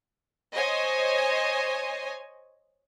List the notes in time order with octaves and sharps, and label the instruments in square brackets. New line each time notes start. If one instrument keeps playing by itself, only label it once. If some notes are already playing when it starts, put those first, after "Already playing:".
[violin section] C5 C#5 D#5 G#5